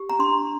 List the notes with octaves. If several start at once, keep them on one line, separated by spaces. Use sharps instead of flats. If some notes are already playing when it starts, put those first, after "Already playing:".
Already playing: G4
A#5
D4 C6